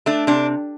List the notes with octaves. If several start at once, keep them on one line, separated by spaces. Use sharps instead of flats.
A3 D4
C3 D4